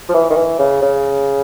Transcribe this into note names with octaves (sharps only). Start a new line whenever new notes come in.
F3
E3
D#3
E3
C#3
C#3